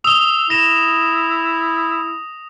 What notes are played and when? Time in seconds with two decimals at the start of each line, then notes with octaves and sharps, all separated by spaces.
0.04 D#6 E6 F7 G7
0.50 E4 A#6 E7